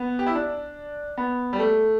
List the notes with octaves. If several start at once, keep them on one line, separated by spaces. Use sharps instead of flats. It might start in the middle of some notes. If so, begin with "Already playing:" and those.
Already playing: B3
G4
E4
D4
B3
G3
A3